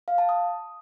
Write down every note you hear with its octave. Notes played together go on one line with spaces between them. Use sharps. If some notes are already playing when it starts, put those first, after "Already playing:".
F5
A5
D#6